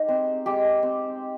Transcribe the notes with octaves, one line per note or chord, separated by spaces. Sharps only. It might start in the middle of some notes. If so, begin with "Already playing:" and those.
Already playing: G#3 D#4 G4
C4
G#3 G4
C4